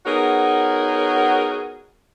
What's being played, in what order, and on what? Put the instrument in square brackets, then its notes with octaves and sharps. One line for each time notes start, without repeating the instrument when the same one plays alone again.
[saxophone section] B3 D#4 F#4 G#4 A#4 C#5